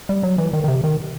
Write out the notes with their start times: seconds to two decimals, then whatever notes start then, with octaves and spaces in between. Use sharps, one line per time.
0.09 G3
0.23 F#3
0.38 E3
0.53 D#3
0.64 D#3
0.68 C3
0.84 D#3